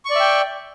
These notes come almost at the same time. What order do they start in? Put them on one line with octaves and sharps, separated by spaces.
C#6 D5 E5 G5